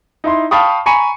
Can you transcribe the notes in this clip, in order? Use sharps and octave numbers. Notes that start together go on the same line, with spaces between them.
D#4 E4 E5 C6
F5 G5 A5 B5 C#6 D#6
G#5 A#5 B5 C#6 C#7 D#7